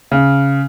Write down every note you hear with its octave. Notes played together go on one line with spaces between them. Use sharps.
C#3